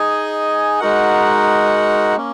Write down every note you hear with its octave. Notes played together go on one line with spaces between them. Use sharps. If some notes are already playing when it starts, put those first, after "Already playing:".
Already playing: D#4 G#4 D#5 G#5
G#3 D#4 F#4 A#4 F#5
A#3 C#4